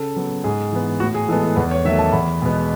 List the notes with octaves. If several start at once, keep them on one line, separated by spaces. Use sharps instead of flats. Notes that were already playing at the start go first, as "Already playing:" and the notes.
Already playing: C#3 A4
F#3 B3
G#2 G#4
E3 B3
A2 F#4
G#4
E3 G#3 B3 A4
A4
E2 B4
C#5
D#3 F#3 A3 E5
A5
E2 B5
B2 G#3 B3